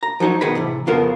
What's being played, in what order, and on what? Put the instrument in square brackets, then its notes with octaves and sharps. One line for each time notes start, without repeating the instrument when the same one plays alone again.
[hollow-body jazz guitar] A#5
F3 F#3 D#4 C#5
B1 D#3 B3 G#4 D#5 B5
A2 C3 E3
F2 C#3 B3 F4 A4 A#4